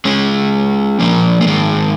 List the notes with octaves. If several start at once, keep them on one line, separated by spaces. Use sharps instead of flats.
G#3 C#4
F3 A#3
A#3
D#3 G#3